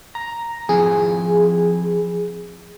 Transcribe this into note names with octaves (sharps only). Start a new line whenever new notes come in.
A#5
F3 C4 E4 G#4